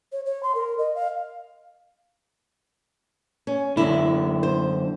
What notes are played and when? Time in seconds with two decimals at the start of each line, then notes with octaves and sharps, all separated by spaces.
0.12 C#5
0.26 C#5
0.43 C6
0.55 A#4
0.78 D#5
0.95 F5
3.47 C#4
3.77 F#2 D3 E4
4.43 C5